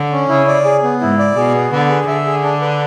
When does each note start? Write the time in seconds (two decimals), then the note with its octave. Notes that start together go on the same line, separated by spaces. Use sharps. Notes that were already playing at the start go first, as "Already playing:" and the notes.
Already playing: D3
0.12 C#4
0.29 C#3 E4
0.48 D5
0.65 G#4
0.83 B3
1.01 G#2 E4
1.19 D5
1.36 B2 G#4
1.54 B3
1.72 D3 B4
1.89 G#4
2.07 D3 E5
2.26 G#4
2.43 D4
2.61 B4